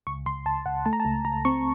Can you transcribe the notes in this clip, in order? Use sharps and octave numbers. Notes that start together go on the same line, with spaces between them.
C#2 C#6
C#2 C6
C#2 A5
C#2 F#5
A3 A5
A#5
A5
C#2
C#2 A#5
C4 C#6